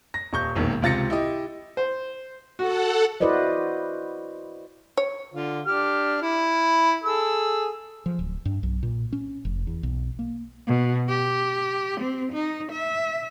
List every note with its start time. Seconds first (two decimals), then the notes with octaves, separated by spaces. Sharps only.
0.14 A#6
0.33 D#1 C#6 G6
0.55 E1 A#1 D#3
0.82 C#2 C3 F4 A6 A#6 C#7
1.10 E4 G4 D#5
1.77 C5
2.59 F#4 A4 F#5
3.20 E4 F#4 B4 C5 D5 D#5
4.97 C#5
5.34 D3 F4
5.66 D4 G4 F6
6.22 E4 B5
7.04 G#4 A4 E6
8.06 F3
8.19 D1
8.45 G2
8.63 B1
8.83 A#2
9.13 C#4
9.45 F1
9.67 E2
9.83 B1
10.19 A#3
10.67 B2
11.08 G4
12.00 C4
12.32 D#4
12.72 E5